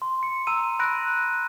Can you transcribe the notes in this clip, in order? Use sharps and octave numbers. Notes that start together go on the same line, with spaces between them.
C6
C#7
A#5 E6 D#7
B5 F#6 A#6 D7